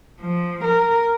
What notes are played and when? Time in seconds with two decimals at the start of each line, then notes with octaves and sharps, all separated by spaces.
0.21 F3
0.64 A#4